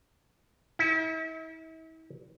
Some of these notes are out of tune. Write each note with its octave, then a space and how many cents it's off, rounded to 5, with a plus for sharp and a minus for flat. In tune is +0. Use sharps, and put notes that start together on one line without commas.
E4 -40